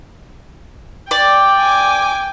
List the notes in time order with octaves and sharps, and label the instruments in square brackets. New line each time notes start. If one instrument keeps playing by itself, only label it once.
[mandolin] D5 [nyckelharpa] G5
[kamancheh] G#5 D6